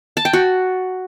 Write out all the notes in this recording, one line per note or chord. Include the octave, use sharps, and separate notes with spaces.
A5
G5
F#4